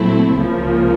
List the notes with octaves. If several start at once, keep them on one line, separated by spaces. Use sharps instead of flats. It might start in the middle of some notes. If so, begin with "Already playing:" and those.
Already playing: A#2 F#3 A3 C4 E4
C#2 C#3 F3 A#3